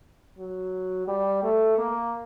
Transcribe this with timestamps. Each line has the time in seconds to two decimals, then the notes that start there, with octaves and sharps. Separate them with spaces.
0.38 F#3
1.07 G3
1.43 A3
1.78 A#3